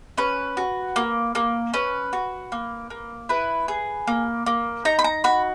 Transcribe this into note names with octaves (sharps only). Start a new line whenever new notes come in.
C#4 B4
F#4
A#3
A#3
C#4 B4
F#4
A#3
A#3
E4 B4
G#4
A#3
A#3
D#4 A#5
B5
A#5
F#4 B5